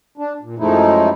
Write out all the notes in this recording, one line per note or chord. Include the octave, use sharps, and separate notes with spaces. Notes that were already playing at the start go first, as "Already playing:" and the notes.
D4
A#2
F#2 F3 G#3 A3 D#4 E4